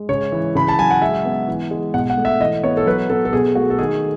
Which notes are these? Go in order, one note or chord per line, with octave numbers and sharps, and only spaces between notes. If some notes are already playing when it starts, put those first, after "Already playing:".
Already playing: G#3
C#3 C#5
E3
C#3 B5
A5
F#3 G#5
F#5
G#3 E5
B3
E3
G#3
B2 F#5
F#5
A3
E5
E3 D#5
B3 C#5
A4
F#3 B4
B3 A4
A4
B2 G#4
A3 F#4
A4
D#3 G#4